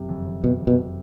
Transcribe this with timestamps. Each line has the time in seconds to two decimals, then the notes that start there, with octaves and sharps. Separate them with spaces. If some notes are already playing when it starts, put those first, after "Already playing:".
Already playing: F#1 C3
0.09 F2
0.27 F2
0.44 F2 B2
0.61 F2
0.67 B2
0.79 F3